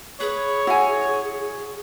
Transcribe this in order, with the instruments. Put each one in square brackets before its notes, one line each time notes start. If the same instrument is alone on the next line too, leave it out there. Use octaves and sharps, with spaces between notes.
[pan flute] G#4 [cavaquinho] B4 [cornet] C#5
[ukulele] E4 G#5 [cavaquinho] F#4